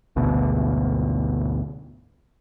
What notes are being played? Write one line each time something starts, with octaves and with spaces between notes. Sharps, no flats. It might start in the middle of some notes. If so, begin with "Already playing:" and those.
G#1 D2 B2